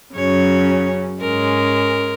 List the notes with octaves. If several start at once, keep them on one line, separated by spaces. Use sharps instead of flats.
F#2 C#3 F#3 C#4 C#5
G#2 G#3 C#4 A#4